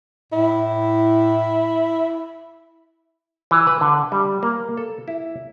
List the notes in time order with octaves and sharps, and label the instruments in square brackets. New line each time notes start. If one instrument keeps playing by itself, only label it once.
[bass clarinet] A2 [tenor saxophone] E4
[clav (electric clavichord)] E3
B4
D3
G3
A#3
A4
E4